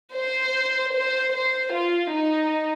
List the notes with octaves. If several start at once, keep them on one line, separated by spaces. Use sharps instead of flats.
C5
C5
C5
F4
D#4